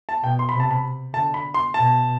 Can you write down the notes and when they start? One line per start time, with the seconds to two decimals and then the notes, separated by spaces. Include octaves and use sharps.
0.09 A5
0.23 B2 G5
0.39 C6
0.49 B5
0.54 C3
0.60 A5
0.71 B5
1.13 D3 A5
1.34 B5
1.54 C6
1.74 B2 A5